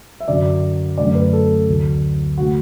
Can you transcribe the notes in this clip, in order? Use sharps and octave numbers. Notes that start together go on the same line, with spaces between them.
E5
F#2 D3 F#3 D5
F#2 D3 A3 D5
B4
A4
D2 D3 F#3
D3 A3 F#4